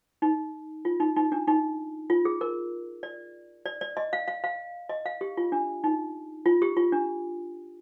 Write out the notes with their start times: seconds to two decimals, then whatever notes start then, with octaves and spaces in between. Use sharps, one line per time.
0.22 D#4
0.85 F4
1.00 D#4
1.16 D#4
1.32 D4
1.47 D#4
2.10 F4
2.25 G#4
2.41 A#4
3.03 D5
3.66 D5
3.81 D5
3.97 D#5
4.13 F5
4.28 F5
4.44 F5
4.89 D#5
5.06 F5
5.21 G4
5.37 F4
5.52 D4
5.84 D#4
6.46 F4
6.62 G4
6.77 F4
6.92 D4